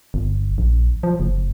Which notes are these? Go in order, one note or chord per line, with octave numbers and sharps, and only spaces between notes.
G1
A#1
F3
F#1